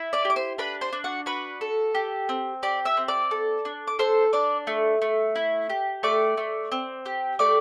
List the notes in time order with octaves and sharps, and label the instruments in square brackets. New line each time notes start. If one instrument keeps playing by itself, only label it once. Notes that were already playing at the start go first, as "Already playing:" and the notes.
Already playing: [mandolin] E4
D5 D6
G4 D6
C5 C6
D4 B4 B5
C5 C6
D4
F#4 F#5
F#4 B4 B5
A4
G4
C4
G4 D5 D6
E5 E6
C4
D5 D6
A4
D4
D6
A4 C5 C6
D4 D5 D6
A3
A3
E4
G4
A3 D5 D6
A3
C4
G4
A3 D5 D6